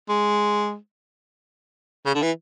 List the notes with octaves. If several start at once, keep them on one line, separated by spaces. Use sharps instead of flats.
G#3
C#3
D3
E3